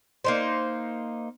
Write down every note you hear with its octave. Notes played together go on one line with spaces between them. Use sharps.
A#3 D#4 C5